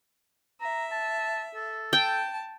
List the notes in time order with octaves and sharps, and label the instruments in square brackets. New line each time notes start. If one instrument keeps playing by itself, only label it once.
[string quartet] E5 [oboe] A#5
[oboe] A5
A4
[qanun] G5 [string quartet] A5